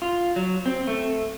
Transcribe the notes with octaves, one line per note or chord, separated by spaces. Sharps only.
F4
F#3
C4
A3